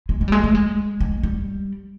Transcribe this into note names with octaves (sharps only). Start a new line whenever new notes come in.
G#3
G#3
G3
G#3
A3
G#3
G#3
G3